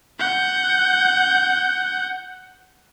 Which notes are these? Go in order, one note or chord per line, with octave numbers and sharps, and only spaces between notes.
F#5 G6